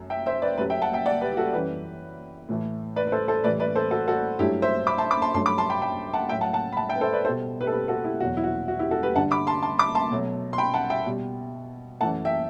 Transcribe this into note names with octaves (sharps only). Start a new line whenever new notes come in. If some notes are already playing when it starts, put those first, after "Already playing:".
Already playing: F#2 F#3 A3
E5 G5
C5 E5
B4 D5
F#2 F#3 A3 G4 B4
E5 G5
F#5 A5
E5 G5
D5 F#5
G4 B4
G4
F#4 A4
F#2 E3 G3 G4 B4
A2 E3 A3
B4 D5
B4
A4 C5
A4 C5
A2 E3 G3 B4 D5
B4 D5
A4 C5
F#4 A4
F#4 A4
G2 F#3 A3 E4 G4
C5 E5
B5 D6
A5 C6
B5 D6
A5 C6
G2 F#3 A3 A5 C6
B5 D6
A5 C6
G5 B5
G5 B5
F#5 A5
A2 F#3 A3 E5 G5
F#5 A5
F#5 A5
B5
F#5 A5
E5 G5
B4
A4 C5
B4 D5
B2 G3 A4 C5
G4 B4
A4
G4 B4
F#4 A4
E4 G4
E2 B2 F#3 F#4
E4
F#4
F#4
E4 G4
F#4 A4
G4 B4
G2 D3 G3 F#5 A5
B5 D6
A5 C6
A5 C6
B5 D6
A5 C6
B2 F#3 A3
C6
G5 B5
F#5 A5
E5 G5
B2 G3
F#2 E3 A3 F#5 A5
E5 G5